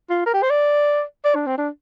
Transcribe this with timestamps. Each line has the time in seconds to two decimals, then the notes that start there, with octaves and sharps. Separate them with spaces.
0.10 F4
0.26 A#4
0.34 G4
0.43 C5
0.50 D5
1.25 D5
1.35 D4
1.47 C4
1.58 D4